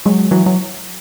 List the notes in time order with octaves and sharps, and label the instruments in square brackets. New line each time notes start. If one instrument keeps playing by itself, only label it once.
[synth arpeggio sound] F#3 G#3
E3 F#3
F#3